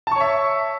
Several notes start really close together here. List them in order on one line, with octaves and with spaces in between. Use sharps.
A5 C#6 C#5 E5